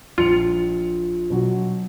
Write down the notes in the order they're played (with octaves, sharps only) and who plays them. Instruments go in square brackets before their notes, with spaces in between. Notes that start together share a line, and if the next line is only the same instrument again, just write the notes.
[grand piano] A#1 C#7 F7 [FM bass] F4
[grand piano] B2 F#3 F#4